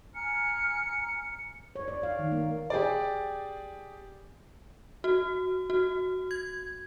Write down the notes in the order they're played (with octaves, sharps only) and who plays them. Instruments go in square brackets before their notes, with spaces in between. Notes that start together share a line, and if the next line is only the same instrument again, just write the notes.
[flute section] G#5 A#5 F6 [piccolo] C#7
[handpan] C#5
D5
F5
D#3
A#3
[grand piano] G4 G#4 D5
[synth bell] F#4
F#4
G#6